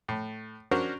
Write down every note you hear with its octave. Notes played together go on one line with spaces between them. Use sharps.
A2
C#4 D4 F#4 A#4 C5